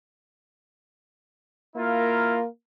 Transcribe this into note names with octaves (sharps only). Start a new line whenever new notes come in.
A#3 E4 F4 A#4